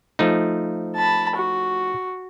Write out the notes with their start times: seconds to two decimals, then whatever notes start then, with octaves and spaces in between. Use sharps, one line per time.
0.19 F3 A3 D#4
0.96 A5 B5
1.36 F#4